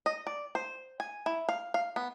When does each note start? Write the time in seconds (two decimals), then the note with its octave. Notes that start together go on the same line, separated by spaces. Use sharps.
0.06 D#5
0.27 D5
0.55 C5
1.00 G#5
1.26 E4
1.49 F5
1.74 F5
1.96 B3